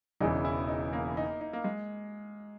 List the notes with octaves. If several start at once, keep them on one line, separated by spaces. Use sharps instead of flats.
E1 E2 C#3 E3 D#4
E4
D#4
A#3
D#4
D#4
A#3
G#3